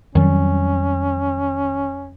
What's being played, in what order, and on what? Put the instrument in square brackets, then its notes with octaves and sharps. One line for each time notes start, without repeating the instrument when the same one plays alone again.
[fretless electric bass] F2 F#3 G3 [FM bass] D#3 [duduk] C#4